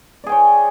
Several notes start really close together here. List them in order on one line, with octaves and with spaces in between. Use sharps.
D5 G#4 G5 C#5